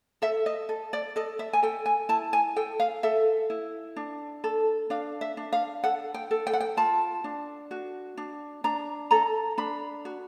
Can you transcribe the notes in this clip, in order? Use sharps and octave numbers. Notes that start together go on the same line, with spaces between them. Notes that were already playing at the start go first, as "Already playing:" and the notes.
A4 E5
D#5
A4
D5
A4 D#5
E5
G#5
A4 G5
G#5
E4 A5
G#5
A4 G5
F5
A4 E5
E4
D4
A4
D4 F5
E5
D4
F5
A4 F#5
G5
A4
G5
F#5
G5
F4 A5
D4
F#4
D4
D4 A#5
A4 A#5
D4 B5
F#4